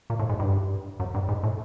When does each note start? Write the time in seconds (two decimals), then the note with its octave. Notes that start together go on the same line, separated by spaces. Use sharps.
0.10 A#2
0.19 A2
0.29 G#2
0.40 G2
1.00 F#2
1.15 G2
1.29 G#2
1.43 A2